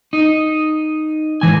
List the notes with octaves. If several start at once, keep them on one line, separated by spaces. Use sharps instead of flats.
D#4
G#2 E3 G#5